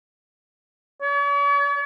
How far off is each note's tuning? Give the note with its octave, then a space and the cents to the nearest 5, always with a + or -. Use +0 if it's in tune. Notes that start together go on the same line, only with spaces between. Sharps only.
C#5 +45